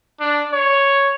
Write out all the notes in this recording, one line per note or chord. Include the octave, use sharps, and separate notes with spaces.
D4
C#5